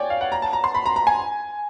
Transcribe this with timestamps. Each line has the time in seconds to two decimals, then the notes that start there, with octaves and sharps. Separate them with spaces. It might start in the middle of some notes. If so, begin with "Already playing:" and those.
Already playing: C#5 D5 G5 G#5
0.10 F5
0.21 F#5
0.32 A#5
0.42 A5
0.53 A#5
0.64 C6
0.74 B5
0.86 A#5
0.96 A#5
1.07 G#5